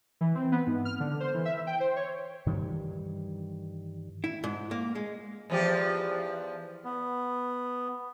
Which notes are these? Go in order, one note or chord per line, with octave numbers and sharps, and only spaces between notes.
E3
C4
B3
G#2
F6
D3
C5
E3
E5
G5
C5
C#5
G2 D#3 E3 G3
E4
G#2
A#3
G#3
E2 F3 G4
B3